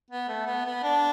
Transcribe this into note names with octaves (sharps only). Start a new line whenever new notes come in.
B3
A3
B3
B3
D4